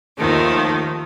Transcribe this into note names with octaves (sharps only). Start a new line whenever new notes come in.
D#2 D#3 F3 A3